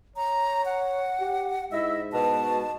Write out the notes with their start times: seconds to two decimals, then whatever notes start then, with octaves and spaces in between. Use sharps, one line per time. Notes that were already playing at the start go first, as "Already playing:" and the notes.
0.16 C#5 A#5
0.65 F#5
1.20 G4
1.72 G#2 E4 D#5 E5
2.12 B2 A5